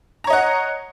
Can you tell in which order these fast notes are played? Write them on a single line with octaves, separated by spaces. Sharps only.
A#5 C#5 D#5 F#5